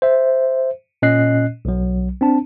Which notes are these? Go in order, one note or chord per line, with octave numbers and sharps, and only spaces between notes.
C5 E5
A#2 C#4 D#5 F#6 C7
B1 F#3
C4 D4 A5